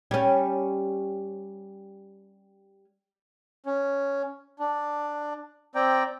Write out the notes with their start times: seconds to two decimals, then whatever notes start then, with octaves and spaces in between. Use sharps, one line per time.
0.11 G3 C#4
3.66 C#4
4.59 D4
5.75 C4 D5 G5 A#5